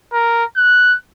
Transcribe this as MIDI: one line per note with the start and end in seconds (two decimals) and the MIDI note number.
0.13 0.45 70
0.57 0.96 90